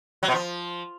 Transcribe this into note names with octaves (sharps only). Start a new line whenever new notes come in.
F#3
B2
F3